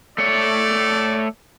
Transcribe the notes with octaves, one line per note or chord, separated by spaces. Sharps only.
A3 C#5 D5